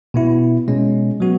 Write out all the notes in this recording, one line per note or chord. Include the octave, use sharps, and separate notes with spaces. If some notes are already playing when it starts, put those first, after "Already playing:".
B2 B3 E4
B2 G#3 C#4
F#3 B3 F#4